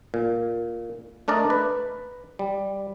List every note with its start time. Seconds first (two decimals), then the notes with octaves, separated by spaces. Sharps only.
0.14 A#2
1.28 A3 D4 A#4 D5 D#5
1.50 B4
2.39 G3